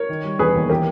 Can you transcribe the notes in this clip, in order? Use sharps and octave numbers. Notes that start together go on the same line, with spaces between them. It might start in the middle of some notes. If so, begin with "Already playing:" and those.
Already playing: A#4 C#5
D#3
G3
E1 G#4 B4
D#2
E3 G4 A#4